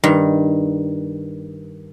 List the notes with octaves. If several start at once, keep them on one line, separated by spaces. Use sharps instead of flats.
G2 D#3